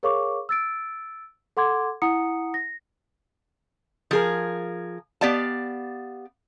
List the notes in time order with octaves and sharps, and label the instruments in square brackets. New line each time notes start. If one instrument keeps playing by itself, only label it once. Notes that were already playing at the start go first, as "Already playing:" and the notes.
[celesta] G#4 A#4 C#5 F5 C#6 D6
E6 A6 D7
A4 F#5 C6 D6 G#6
E4 F#5 A#5 D#6 C#7
A#6
[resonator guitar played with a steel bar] F3 G#4 A#4
B3 G4 D5 F5 A5